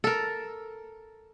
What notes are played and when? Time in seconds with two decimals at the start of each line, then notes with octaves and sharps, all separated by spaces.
0.04 A4 A#4